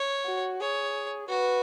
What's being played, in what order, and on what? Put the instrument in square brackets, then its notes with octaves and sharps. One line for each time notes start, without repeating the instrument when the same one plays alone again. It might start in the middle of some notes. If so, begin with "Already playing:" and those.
Already playing: [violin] C#5
[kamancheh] F#4
[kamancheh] G#4 [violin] C#5
[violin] F#4 [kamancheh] B4